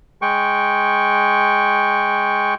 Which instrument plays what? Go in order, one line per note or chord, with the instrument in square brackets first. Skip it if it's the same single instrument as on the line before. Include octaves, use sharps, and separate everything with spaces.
[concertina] G#3 G5 C#6